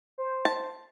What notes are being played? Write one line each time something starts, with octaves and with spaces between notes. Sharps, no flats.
C5
A5